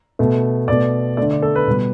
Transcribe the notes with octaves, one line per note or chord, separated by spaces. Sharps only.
B2 A3
B2 A3 D5
D3 A3 D5
D5
A4
B4
B2 G3